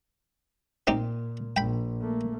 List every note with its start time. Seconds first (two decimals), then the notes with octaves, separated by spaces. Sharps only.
0.87 A#2 C4 D#4 G4
1.57 A#1 G5 B5
2.01 A3 A#3